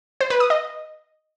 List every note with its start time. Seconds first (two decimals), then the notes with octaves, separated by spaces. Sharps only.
0.21 C5
0.30 B4
0.40 D#6
0.50 D#5